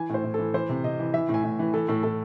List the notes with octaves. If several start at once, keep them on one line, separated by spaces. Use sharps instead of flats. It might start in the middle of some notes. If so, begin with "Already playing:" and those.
Already playing: E3 G#5
A2 C5
A2
E3 A4
E3 C5
C3
C3 D#5
E3
E3 E5
A2
G#5
A2
E3
E3 A4
A2 A4
A2 A4